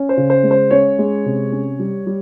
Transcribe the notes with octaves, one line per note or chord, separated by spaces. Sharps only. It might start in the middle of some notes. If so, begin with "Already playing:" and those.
Already playing: C#4
C5
C#3
C5
G#3
C5
C#4 C#5
G#3
C3
C#4
G3
G3